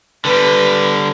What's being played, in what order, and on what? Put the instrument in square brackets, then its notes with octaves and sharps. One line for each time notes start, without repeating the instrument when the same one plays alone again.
[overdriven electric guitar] D3 G3 [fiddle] B4